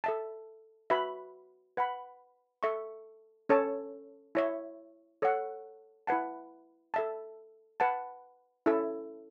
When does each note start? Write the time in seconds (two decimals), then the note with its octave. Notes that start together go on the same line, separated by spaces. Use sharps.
0.04 A4 E5 A5
0.90 F#4 B4 E5 B5
1.77 B4 F#5 B5
2.63 A4 E5 C#6
3.49 C#4 A4 C#5 A5
4.35 E4 C#5 E5
5.22 A4 C#5 F#5
6.07 E4 B4 F#5 A5
6.94 A4 E5 A5
7.80 B4 F#5 A5
8.66 C#4 E4 A4 E5